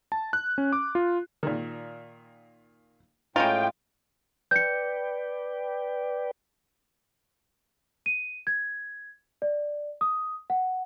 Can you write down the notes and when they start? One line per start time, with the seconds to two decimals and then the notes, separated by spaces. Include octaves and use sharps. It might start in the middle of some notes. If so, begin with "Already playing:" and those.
0.12 A5
0.33 F#6
0.58 C#4
0.73 D6
0.95 F4
1.43 A#2 D#3
3.36 A2 G#3 C#4 F4 G5 A#5
4.51 B4 D5 G5 G6 C#7
8.06 D#7
8.47 G#6
9.42 D5
10.01 D#6
10.50 F#5